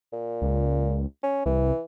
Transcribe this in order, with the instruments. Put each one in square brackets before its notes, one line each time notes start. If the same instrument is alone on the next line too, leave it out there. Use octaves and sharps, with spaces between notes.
[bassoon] A#2
[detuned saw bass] C#2
[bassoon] C#4
[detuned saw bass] C2 [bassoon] E3